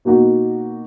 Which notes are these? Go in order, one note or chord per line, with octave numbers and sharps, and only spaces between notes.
B2 A#3 D#4 F#4